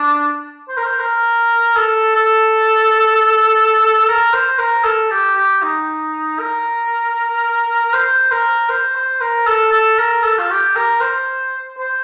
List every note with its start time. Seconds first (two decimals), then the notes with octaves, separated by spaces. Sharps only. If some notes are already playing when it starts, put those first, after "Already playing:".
Already playing: D4
0.69 C5
0.77 A#4
0.85 C5
0.99 A#4
1.76 A4
2.15 A4
4.08 A#4
4.33 C5
4.59 A#4
4.84 A4
5.11 G4
5.36 G4
5.62 D#4
6.39 A#4
7.93 C5
8.31 A#4
8.69 C5
8.96 C5
9.21 A#4
9.47 A4
9.72 A4
9.99 A#4
10.24 A4
10.38 F4
10.50 G4
10.76 A#4
11.01 C5
11.78 C5